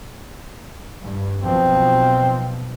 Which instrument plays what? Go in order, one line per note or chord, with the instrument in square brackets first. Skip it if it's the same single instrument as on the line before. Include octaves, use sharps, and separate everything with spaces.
[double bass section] G2
[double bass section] B1 B2 F3 [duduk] C4